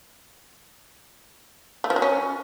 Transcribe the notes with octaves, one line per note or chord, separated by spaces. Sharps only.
A3
F3
F#3
C#4